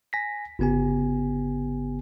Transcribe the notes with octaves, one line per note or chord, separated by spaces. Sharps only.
G#5 A#6 B6
G1 C#3 B3 G4 G#5